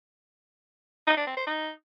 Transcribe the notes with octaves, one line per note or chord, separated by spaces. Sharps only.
D#4
D4
C4
C5
D#4